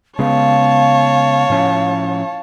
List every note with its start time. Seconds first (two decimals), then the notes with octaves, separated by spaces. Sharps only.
0.19 C#3 G#3 B3 C#5 F5 A5
1.50 A2 F3 C#4